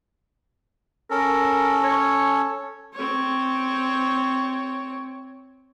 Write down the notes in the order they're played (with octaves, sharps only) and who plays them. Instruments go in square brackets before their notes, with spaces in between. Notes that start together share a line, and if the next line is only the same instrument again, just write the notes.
[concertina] C#4 A4 [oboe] A#4
[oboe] C#5
[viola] C4 C#5